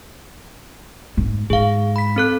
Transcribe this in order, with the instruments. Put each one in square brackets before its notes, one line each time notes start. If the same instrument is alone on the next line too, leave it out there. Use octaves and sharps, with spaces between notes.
[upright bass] G#2
[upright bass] G#2 [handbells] G#4 F5
[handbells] B5 B6
C4 A4 F#6